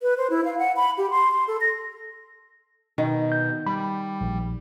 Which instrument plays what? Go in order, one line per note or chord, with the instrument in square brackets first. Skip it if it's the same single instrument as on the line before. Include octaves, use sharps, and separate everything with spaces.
[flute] B4
C5
E4
F5
F#5
B5
G4
C6
C6
A4
A#6
[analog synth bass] B2 [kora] D#3
[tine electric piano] G6
[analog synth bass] G3 [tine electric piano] B5
[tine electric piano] A#1